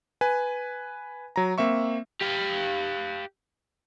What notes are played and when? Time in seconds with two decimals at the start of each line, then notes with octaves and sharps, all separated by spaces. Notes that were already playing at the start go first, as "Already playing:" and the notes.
0.21 B4 G#5
1.36 F#3 A#5
1.58 A#3 C4 E5 C#6
2.21 G4 F5